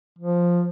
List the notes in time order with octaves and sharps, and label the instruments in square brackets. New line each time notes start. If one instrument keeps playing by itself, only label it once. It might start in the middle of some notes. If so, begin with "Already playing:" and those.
[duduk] F3